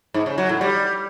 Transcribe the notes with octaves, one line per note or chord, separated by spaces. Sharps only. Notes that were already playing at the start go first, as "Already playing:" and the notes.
G#2
C#3
F#3
A2
G3